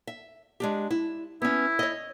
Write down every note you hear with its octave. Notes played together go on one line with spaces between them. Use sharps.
E5
G#3 D4 G4
E4
B3 C#4 E4
C#5 D#5